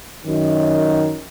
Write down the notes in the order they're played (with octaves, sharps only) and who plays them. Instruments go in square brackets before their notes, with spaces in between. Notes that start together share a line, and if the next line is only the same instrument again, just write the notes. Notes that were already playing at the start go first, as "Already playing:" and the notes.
[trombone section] F#2 D#3